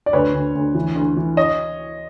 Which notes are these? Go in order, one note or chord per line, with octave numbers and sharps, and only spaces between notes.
D5
D2 B4 C#5
D2
D2
E3
D2
E3
C#5 D#5